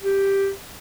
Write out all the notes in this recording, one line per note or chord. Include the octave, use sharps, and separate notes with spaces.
G4